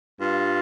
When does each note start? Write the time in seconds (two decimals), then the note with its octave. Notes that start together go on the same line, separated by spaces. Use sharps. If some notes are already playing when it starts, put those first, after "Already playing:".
0.21 G2 F4